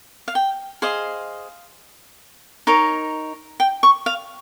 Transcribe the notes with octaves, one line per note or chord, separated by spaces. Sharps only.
F5
G5
G#4 C5 D#5 F5
D#4 A#4 C#5
G5
C#6
F5